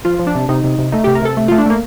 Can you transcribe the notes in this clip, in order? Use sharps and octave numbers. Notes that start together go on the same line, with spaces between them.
F3 F4
F3
D4
C3
C3 D#4
C3
C3
A3 D#4
C3 G4
A#4
C3 A4
A3
A3 F4
D4
A3 A#3